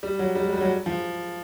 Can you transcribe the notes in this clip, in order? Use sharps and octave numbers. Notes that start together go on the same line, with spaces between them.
G3
F#3
G3
G#3
G3
F#3
F3